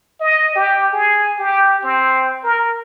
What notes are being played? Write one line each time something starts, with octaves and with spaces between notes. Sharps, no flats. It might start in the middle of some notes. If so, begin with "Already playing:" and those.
D#5
G4
G#4
G4
C4
A#4